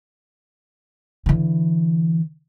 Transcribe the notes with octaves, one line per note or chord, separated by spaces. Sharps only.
D3 E3